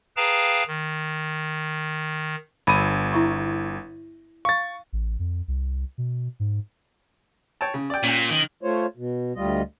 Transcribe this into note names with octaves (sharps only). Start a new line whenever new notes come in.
G#4 B4 F5 G5 A5 A#5
D#3
G1 B5 D6 E6 D#7
E4 E5 C#6
F5 C#6 A6
A1
F2
C2
B2
G#2
C#5 G5 A5
C#3
D5 G5
A#2 C#4 G5
D#3
A3 F4 C5 C#5
B2
D2 G3 F4 D#5